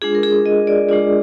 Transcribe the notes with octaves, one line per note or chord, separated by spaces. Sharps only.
G#3 D4 F4 G#4
A#4
G#4
D#5
D5
G#3 D4 F4 D5